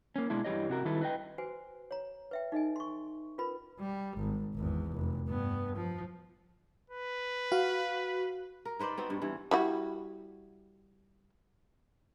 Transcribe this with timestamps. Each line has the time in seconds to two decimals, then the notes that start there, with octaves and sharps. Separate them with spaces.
0.16 A#3 C#4
0.30 B2 G#3 D4 E4
0.45 G2 E3 G3 G4 C#5 D#5
0.69 C3 F#4 A#4
0.85 D#3 G3 E4 A4 B4
1.01 B4 D#5 G5
1.38 F#4 B4 C5 G#5
1.91 C#5 A#5
2.31 B4 E5 G5
2.52 D#4 A4 D#5 G#5
2.76 C6 C#6
3.38 C#4 F4 A#4 B4 B5
3.80 G3
4.17 G#1
4.54 G#1 E2
4.91 F1
5.29 G2 B3
5.75 F3
6.90 B4
7.52 F#4 F5
8.65 A#4
8.79 D#4 B4 C5 D5
8.98 B3 C4 F#4
9.10 G2
9.22 G2 E3
9.51 G3 E4 F#4